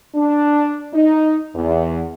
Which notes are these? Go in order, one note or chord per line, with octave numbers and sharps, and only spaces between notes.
D4
D#4
E2